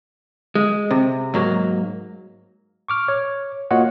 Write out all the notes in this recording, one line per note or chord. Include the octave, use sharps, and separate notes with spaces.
G#3
C3
G#2 F#3 A#3
C#6 D6 F6
C#5
A#3 F4 F#4 C#5 D#5 F#5